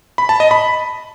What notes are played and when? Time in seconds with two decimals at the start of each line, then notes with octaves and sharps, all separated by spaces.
0.18 B5
0.29 A5
0.40 D#5
0.51 B5